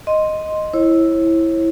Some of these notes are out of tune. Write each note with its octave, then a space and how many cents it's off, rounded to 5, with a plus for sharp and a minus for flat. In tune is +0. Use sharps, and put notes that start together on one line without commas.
D#5 +0 C6 +0
E4 +0 C#5 -40